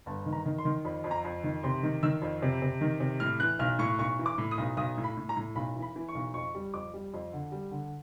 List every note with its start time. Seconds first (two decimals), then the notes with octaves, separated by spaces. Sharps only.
0.06 G1 A5
0.26 D#3
0.33 A#5
0.45 D#3
0.58 C6
0.65 D#3
0.85 F2 B5
1.04 F2
1.11 A#5
1.25 F2
1.44 D#3
1.63 C3 C6
1.83 D#3
2.03 D#3 E6
2.22 F2
2.42 C3
2.62 C3
2.81 D#3
3.00 C3
3.20 A2 F6
3.40 E3 F#6
3.59 B1 F6
3.79 A2 C#6
3.99 B1 C#6
4.19 E3
4.26 D6
4.38 A2
4.51 D#6
4.58 B1
4.77 B1 D#6
4.98 A2
5.04 B5
5.17 A2
5.29 A#5
5.37 A2
5.55 B1 B5
5.76 E3
5.82 B5
5.96 E3
6.09 C#6
6.15 B1
6.34 F2 C#6
6.55 G3
6.74 F2 D6
6.94 G3
7.14 F2
7.33 D3
7.52 G3
7.71 D3